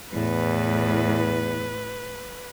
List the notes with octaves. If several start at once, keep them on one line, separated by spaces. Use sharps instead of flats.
E2 A2 B4